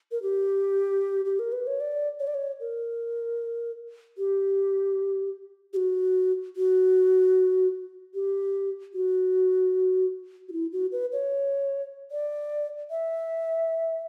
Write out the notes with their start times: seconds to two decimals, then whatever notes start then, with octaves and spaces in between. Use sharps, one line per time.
0.12 A#4
0.22 G4
1.25 G4
1.39 A#4
1.52 B4
1.67 C#5
1.80 D5
2.20 C#5
2.27 D5
2.34 C#5
2.60 A#4
4.18 G4
5.73 G4
5.76 F#4
6.56 F#4
8.14 G4
8.94 F#4
10.49 F#4
10.53 E4
10.72 F#4
10.92 B4
11.12 C#5
12.11 D5
12.91 E5